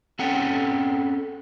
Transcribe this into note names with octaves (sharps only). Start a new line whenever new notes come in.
C4 C#4 A4 F#5 G5